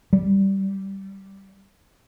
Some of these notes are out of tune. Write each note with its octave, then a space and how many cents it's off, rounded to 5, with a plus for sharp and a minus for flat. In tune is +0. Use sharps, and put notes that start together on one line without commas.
G3 -10